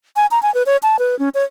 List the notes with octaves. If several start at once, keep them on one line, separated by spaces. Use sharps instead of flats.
G#5
A#5
G#5
B4
C#5
A5
B4
C#4
C#5